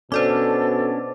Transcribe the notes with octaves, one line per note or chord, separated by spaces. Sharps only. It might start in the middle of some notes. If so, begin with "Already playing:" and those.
B2 C#4 D4 A4 C5 D5 D6